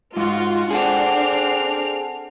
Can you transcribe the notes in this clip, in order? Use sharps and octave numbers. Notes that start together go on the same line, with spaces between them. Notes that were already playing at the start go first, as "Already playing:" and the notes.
G#2 F4 F#4
C4 D4 G#4 A4 F#5 F6